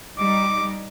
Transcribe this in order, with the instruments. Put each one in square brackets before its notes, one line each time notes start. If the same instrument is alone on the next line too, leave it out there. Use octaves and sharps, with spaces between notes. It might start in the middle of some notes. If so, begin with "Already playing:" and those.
[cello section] G3 D#4 [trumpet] D6